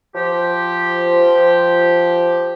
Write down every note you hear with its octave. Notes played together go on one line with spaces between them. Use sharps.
F3 G4